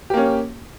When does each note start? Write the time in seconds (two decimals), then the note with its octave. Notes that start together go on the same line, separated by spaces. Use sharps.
0.10 G4
0.14 A#3
0.17 C#4